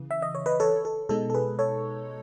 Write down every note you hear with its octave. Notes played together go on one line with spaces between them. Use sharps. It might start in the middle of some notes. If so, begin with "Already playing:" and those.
Already playing: C#3 E3
E5
D#5
C#5
B4 D#5
A4 C#5
A4
B2 G#3 D#4 A4
A4
G#4 B4
A4 C#5